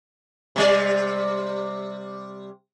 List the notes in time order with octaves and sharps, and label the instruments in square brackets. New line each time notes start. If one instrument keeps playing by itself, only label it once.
[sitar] C3 G3 D5